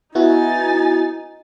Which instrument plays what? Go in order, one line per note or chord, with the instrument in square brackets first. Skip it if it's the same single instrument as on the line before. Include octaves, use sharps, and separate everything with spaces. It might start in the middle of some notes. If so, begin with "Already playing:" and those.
[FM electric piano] B3 E4 F#4 [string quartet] D#4 G#5 A6